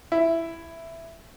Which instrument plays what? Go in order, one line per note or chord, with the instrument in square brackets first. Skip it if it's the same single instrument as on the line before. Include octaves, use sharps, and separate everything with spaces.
[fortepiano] E4